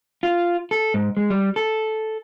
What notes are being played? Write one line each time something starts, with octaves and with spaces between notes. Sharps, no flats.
F4
A4
G#2
G#3
G3
A4